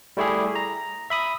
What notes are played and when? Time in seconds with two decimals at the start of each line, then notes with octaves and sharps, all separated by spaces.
0.17 G3 A3 E4 G4 G#4
0.55 A#5
1.10 E5 B5 D#6